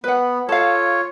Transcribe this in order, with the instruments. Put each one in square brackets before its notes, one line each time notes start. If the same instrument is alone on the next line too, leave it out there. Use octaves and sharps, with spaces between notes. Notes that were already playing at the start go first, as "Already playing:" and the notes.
[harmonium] B3 [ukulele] B4 F#5
[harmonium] F4 C#5 [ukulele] A4 F5